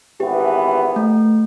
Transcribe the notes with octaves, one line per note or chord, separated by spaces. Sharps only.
G#1 E3 B3 G4
A3